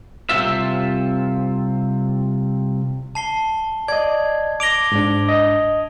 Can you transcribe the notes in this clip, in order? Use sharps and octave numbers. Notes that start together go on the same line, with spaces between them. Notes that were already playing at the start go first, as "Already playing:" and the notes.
C2 C3 G#3 C4 F4 E5
A5 C7 G7
D5 D#5 G#6
D6 A#6 D7 F7 G7
G#2 D4
D#5